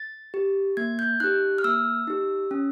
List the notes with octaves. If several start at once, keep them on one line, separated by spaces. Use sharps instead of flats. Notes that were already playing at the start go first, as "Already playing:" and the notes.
Already playing: A6
G4
A#3 G#6
G6
D#4 G4 F#6
F6
A#3 E6
D#4 G4
C#4